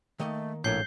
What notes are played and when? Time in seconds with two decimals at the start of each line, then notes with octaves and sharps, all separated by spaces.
0.20 D#3 A3 A#3 D#5
0.64 A#1 A2 A#3 C#5 G6 C7 G7